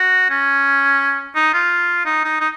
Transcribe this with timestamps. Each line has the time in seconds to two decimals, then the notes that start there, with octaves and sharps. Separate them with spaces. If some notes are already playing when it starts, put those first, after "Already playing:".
Already playing: F#4
0.30 C#4
1.35 D#4
1.53 F4
2.06 D#4
2.24 D#4
2.41 D#4